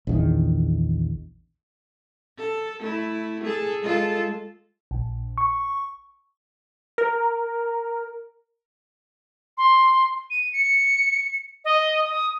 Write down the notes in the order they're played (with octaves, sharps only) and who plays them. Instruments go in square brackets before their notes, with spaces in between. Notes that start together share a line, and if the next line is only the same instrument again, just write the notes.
[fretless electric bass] A#1 E2 D#3
[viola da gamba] A4
A3 E4
G#4 A4
G#3 F4 A4
[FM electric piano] A#1
C#6
[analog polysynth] A#4
[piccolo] C6
D#7
C#7
D#5
D#6